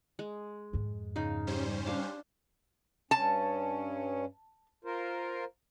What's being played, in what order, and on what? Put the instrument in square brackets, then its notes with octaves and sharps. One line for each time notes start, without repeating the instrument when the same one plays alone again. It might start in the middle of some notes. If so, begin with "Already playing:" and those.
[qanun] G#3
[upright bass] F2 G#2
[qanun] C#3 D#4 F5
[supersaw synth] G3 C#4 C5
[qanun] D4 F5 A5
[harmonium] G2 C#4 [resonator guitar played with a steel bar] A5
[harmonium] F4 A#4 C5